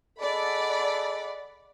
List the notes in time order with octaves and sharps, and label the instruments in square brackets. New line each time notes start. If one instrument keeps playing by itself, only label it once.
[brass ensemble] G#4 A4 D#5 [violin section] D5 F#5 B5